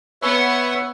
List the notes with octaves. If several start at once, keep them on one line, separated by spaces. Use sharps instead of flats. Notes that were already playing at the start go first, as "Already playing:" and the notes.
B3 B4 C#5 E5 F#5